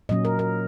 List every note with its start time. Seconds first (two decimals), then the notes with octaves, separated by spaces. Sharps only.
0.09 A#2 F#3 C#4 D#5
0.25 A#4
0.39 A#4